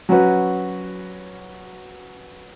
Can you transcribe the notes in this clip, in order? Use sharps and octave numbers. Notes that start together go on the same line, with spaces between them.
F#3 C#4 F#4 B4